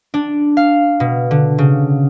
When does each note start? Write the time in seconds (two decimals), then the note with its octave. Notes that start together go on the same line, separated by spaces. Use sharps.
0.14 D4
0.57 F5
1.00 B2
1.31 D3
1.58 C#3